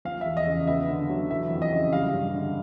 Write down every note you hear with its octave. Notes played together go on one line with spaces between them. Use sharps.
F3 F5
E2 E5
D#5
C#3
D#5
B3 E5
D3
F#3
E3 E5
F2
D#5
C#3
G3 F5
G2
D3